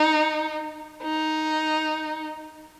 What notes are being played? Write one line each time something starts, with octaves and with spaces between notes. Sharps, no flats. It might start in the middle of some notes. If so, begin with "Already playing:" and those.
Already playing: D#4
D#4